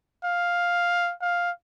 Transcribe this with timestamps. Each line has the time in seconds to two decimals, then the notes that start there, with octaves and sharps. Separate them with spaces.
0.25 F5
1.22 F5